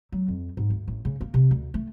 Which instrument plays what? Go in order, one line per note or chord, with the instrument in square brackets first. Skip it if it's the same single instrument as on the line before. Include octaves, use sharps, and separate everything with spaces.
[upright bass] F#3
F2
G#2
D2
A1
C#3
A#3
C3
D2
A3